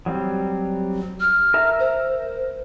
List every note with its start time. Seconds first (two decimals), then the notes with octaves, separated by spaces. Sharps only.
0.06 F#3 G3 C4
1.20 F6
1.54 A#4 E5 A#5
1.80 C5